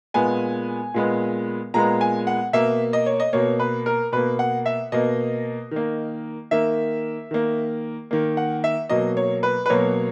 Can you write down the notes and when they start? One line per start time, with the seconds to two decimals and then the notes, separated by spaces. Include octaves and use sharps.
0.14 A#2 G#3 B3 G#5
0.94 A#2 G#3 B3
1.74 A#2 G#3 B3 A#5
2.01 G#5
2.27 F#5
2.53 B2 A#3 E5
2.93 D#5
3.06 C#5
3.20 D#5
3.33 B2 A#3 C#5
3.60 B4
3.86 A#4
4.12 B2 A#3 B4
4.39 F#5
4.66 E5
4.92 B2 A#3 D#5
5.71 D#3 A#3
6.51 D#3 A#3 E5
7.31 D#3 A#3
8.11 D#3 A#3
8.37 F#5
8.64 E5
8.90 B2 F#3 A#3 D#5
9.17 C#5
9.43 B4
9.66 B4
9.70 B2 F#3 A#3 C#5